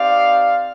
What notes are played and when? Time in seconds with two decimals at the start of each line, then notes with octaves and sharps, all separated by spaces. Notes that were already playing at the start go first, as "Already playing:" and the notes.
Already playing: C4 D#4 G4 D5 F5